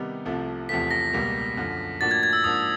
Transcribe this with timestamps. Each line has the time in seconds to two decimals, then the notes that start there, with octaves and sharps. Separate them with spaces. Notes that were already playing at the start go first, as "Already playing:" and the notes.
Already playing: C3 D#3 G3 B3 D#4
0.25 C2 C3 F3 A3
0.69 E2 C3 F3 A3 B6
0.91 A#6
1.13 C#2 B2 G3 A#3
1.57 F#2 D3 F3
2.01 A2 F3 A#3 D4 F#4 A6
2.11 G#6
2.23 G#6
2.33 E6
2.44 G#2 F3 A#3 D4 D#6